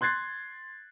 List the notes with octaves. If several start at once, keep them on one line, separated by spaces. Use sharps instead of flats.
C6 F#6 G#6 A6 C7